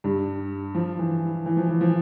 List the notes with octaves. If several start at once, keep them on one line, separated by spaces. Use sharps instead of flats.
G2
F3
E3
E3
F3
E3
F3